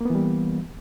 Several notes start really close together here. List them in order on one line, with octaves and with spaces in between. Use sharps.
A#3 B3 E3 G3